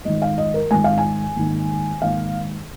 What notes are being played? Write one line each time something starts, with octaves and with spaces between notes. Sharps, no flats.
G#1 G#2 D#3 D#5
F5
D#5
A#4
G#1 G#2 D#3 G#5
F5
G#5
G#1 G#2 D#3 A#3
G#1 G#2 D#3 A#3 F5